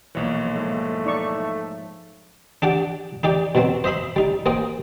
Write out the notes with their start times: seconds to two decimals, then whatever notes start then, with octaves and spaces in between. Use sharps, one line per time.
0.15 B1 A#2 E3 F3 C#5
0.55 G#2 A3
1.06 D#4 D5 C#6
2.62 D4 G4 D5 F#5
3.23 D#4 G4 D5 G5
3.55 B2 F#3 C4
3.84 C5 D#5 E5 B5 C6
4.16 G3 D#4
4.46 A#3 C5 D#5 G5